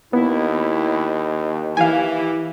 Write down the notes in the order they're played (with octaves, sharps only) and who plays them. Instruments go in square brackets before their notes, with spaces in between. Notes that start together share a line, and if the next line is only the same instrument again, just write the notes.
[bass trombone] D#2 [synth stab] B3 [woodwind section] E4
[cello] E3 [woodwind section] E4 G4 [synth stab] F5 G#5